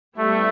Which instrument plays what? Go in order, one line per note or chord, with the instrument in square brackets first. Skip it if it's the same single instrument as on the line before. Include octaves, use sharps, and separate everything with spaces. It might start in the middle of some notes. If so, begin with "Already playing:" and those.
[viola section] G3 B3 E4 G4 [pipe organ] A3